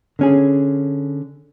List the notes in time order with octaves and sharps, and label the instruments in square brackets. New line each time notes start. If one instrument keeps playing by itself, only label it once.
[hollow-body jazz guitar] D3 C#4 G#4